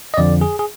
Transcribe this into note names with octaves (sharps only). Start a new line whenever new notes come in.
D#5
F2 D3 F3 D5
G#4
G#4